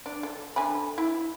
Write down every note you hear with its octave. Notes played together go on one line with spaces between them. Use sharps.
D4
A4
D3 G#5 B5
E4